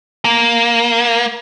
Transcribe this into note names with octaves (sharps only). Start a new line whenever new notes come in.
A#3